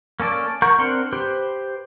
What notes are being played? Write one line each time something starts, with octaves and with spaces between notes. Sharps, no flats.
A#3 C#4 A4 D5
A#4 F#5 A#5 C#6 G6
C4 D4 A#4 F#5 C6
G4 B4 C5